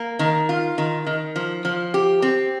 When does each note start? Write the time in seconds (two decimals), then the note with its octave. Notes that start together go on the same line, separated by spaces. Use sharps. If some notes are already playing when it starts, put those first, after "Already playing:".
Already playing: A#3
0.19 D#3
0.49 F4
0.78 D#3
1.06 D#3
1.36 F3
1.65 F3
1.94 G4
2.22 C4